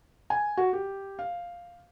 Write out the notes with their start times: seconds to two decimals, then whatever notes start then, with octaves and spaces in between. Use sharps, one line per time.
0.30 G#5
0.57 F#4
0.73 G4
1.19 F5